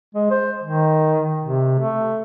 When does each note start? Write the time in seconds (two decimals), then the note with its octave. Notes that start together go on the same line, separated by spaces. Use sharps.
0.15 G#3
0.31 C5
0.63 D#3
1.43 C3
1.79 A3